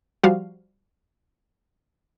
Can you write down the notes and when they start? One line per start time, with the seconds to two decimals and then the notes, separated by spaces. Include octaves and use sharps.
0.23 F3 G3 F#4 F5